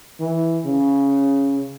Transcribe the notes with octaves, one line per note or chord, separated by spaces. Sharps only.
E3
C#3